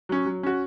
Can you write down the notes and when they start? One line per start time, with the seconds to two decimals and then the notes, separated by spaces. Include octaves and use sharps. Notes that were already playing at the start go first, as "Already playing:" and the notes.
0.09 F#3 C#4
0.26 F#3
0.43 C#4 F#4